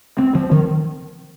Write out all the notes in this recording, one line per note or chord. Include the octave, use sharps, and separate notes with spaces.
C4
F3
D#3